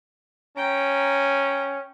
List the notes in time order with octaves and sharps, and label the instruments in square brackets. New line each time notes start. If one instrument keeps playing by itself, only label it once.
[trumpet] C#4 [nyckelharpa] G5 A#5